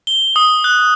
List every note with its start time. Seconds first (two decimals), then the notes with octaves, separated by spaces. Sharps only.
0.07 G7
0.36 D#6
0.64 F#6